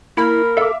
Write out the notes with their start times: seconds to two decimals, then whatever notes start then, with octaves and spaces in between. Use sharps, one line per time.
0.17 A#3 E4 A#4 B5
0.57 A4 E5 F5 D6